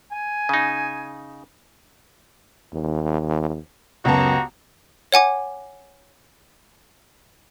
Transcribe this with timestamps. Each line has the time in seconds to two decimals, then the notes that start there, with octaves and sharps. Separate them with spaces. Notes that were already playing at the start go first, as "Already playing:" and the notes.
0.12 G#5
0.49 C#3 D#4
2.74 D#2
4.05 C#2 F#2 B3 F#4 G4 A5 A#5
5.12 C#5 F#5 G#5 D6